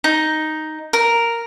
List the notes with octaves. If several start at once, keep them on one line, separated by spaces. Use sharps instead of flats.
D#4
A#4